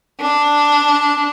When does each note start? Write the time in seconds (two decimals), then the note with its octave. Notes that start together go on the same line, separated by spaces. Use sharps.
0.21 D4